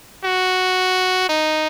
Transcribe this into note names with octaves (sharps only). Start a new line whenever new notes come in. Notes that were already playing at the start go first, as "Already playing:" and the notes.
F#4
D#4